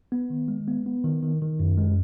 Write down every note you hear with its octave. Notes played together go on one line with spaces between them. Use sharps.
B3
D#3
G#3
B3
B3
D#3
D#3
D#3
F#2
G#3